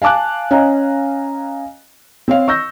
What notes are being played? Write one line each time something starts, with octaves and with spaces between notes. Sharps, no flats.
F5 G#5 A5 D6 F#6
C#4 D#5 F5 G#5 A#5
C4 C#5 F5
C#6 E6 G6 A#6